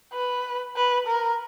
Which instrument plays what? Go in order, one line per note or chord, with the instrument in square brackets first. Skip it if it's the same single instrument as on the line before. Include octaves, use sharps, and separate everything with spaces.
[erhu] B4
B4
A#4